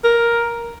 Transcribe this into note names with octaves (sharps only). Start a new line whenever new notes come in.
A#4